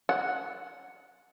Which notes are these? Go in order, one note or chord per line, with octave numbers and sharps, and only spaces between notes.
F#5